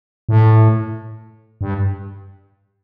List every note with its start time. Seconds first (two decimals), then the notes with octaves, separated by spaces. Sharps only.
0.29 A2
1.61 G2